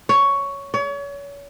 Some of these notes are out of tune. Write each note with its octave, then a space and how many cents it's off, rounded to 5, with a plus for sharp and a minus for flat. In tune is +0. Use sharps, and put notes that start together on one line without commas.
C#5 +10
C#5 +35